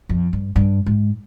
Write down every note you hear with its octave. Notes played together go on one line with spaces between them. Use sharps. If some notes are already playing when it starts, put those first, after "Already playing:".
F2
G2
G2
G#2